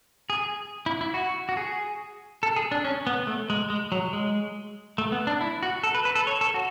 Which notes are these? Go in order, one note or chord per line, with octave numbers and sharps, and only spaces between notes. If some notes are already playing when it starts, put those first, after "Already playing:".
G#4
E4
E4
F#4
F#4
G#4
A4
G#4
D4
C#4
B3
A3
G#3
G#3
F#3
G#3
A3
B3
D4
E4
F#4
A4
B4
B4
A4
C#5
A4
F#4